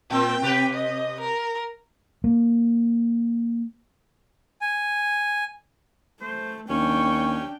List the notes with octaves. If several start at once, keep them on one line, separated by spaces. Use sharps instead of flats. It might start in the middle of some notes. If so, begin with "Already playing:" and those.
A#2 C4 G5
C3 G4 B4
D#5
A#4
A#3
G#5
A3 C5
D#2 C#4 D4 G5 C#6